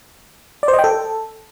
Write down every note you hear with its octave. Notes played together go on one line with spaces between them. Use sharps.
D5
C5
D#5
G5
A4